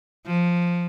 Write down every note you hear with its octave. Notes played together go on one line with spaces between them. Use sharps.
F3